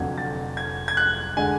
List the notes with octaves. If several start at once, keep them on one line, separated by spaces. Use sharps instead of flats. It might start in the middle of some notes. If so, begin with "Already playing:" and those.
Already playing: F1 F2 D3 F#3 G#6
A6
G#6
G#6
F#6
D3 G#3 D4 G#5